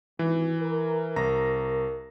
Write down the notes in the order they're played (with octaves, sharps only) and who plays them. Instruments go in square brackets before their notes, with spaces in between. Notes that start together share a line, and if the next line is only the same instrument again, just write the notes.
[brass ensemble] G#1 [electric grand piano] E3
[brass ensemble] A#4
[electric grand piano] C2 A#5 A#6